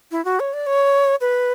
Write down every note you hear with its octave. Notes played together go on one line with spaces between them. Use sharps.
E4
F#4
C#5
D5
C#5
B4